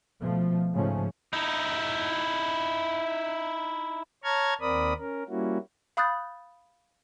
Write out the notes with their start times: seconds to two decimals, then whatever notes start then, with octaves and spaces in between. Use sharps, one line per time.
0.20 B2 F3 A3
0.73 G#2 C#3 F3 A3 C#4
1.33 D#4 E4
4.24 C#5 A5 A#5 C#6 F6 G#6
4.61 D#2 C4 A#4 D5 B5 D#6
4.99 C#4 A#4
5.29 G3 A#3 C#4 E4 F#4
5.97 F5 B5 D#6 F#6 G6 A6